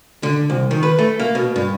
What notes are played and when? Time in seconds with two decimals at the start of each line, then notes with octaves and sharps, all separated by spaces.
0.23 D3
0.50 C2
0.71 D#3
0.83 B4
0.99 A3
1.20 A#3
1.35 B2
1.56 G2